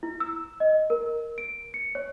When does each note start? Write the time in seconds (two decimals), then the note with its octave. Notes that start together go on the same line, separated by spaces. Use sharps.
0.03 E4
0.20 E6
0.60 D#5
0.90 A#4
1.38 D7
1.74 C#7
1.95 C#5